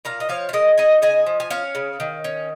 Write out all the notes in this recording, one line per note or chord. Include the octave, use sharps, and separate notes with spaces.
A#2 F5 A#5
D#5
F3 C#5 F5
F5
G#3 A#4 D#5
D#4 D#5 G#5
C#3 D#5 G#5
F3
G#5
C#4 C#5 F5
C#3
D#3
C#4